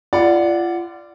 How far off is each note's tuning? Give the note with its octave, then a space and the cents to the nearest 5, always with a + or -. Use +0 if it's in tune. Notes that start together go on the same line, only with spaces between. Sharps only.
F4 -30 D5 +0 F#5 +0